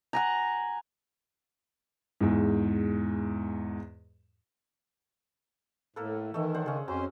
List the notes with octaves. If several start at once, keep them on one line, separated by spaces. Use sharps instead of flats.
F#5 G#5 A#5
E2 G#2
A2 A#3 A4 B4
D#3 E3 A3 D#5 E5
D4 C5 F#5
C#3 C#4 G#4
F2 F#3 C#4 C5